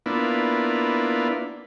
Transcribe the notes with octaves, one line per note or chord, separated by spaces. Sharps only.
A#3 B3 D4 E4 F4